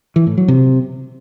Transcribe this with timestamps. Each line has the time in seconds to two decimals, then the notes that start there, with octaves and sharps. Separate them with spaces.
0.16 E3
0.27 A2
0.38 F#3
0.48 C3